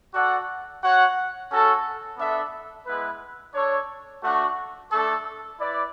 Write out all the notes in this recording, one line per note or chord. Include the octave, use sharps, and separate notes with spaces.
F#4 A4 D5 F#5
F#4 C#5 F#5
C#4 F#4 A4
B3 D4 A4 E5
G#3 B3 E4 B4
D4 A4 C#5
A3 D4 F#4
A3 D4 A4
E4 B4 D5